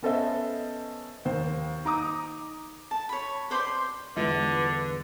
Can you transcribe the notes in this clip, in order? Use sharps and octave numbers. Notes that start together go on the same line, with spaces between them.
B3 C#4 A4 C5 D#5 E5
D#2 C5
D#4 A#5 D6 D#6
A5
C#5 B5
B4 C5 D5 C6
G1 E2 D3 G#3 F4 B4